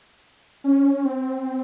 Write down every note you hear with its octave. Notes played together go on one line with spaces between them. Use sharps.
C#4
C4